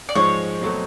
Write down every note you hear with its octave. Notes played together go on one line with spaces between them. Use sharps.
D5
G#2 F3 G#3 C#5
B2 F#3 A3 C4